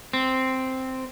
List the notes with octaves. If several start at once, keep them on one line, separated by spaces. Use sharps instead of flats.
C4